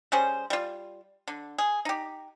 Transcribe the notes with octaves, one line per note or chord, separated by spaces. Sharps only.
G3 C#4 G#4 C5
G3 F4
D3
G#4
D#4 G4